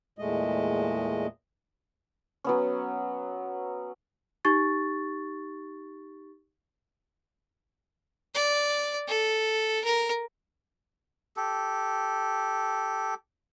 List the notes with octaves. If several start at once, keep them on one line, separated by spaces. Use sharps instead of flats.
E2 A#2 G#3 A3 D#5
F#3 B3 C#4
D#4 G4 C#6 A6
D5
A4
A#4
G4 A4